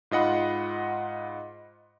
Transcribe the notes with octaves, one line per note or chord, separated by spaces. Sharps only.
G#2 F4 D#5 F#5 B5